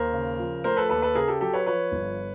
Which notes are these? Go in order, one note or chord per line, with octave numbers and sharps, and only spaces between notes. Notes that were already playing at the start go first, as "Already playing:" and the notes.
Already playing: D#2 A#4 C5
C#3
F3
A3 A#4 C5
A4 B4
D#2 A4 B4
A4 B4
C#3 G#4 A#4
G4 A4
F#3 G4 A4
B4 C#5
F3 B4 C#5
G1